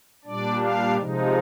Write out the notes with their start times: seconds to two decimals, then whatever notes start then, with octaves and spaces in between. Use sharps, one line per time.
0.25 A#2 G3 D4 D5
0.61 F5
0.98 C3 F3 G#3 D#4